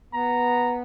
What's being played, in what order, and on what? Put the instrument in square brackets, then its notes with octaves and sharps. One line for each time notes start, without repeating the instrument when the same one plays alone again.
[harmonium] B3 [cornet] A#5